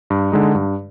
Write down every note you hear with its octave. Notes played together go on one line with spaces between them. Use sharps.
G2
D3 G#3 D#4
G2